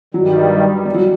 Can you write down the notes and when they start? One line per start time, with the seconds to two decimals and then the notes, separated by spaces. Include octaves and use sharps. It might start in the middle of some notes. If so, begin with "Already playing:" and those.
0.14 G2 D#3 F#3 G3
0.85 G3
0.94 F#3